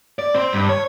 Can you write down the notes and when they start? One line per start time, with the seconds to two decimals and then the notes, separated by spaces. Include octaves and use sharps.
0.19 D5
0.34 C4 C5
0.53 G2
0.69 C#5